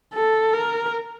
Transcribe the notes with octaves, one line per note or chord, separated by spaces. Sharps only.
A4
A#4